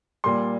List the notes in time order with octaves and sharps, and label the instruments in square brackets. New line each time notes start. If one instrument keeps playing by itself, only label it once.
[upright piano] A#2 G3 C6